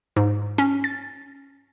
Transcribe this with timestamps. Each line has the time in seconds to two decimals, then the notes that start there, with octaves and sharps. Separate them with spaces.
0.16 G#2
0.58 C#4
0.84 A6